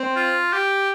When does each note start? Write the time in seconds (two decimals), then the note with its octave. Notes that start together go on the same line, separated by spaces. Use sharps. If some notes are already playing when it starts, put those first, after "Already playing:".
Already playing: C4
0.16 F4
0.53 G4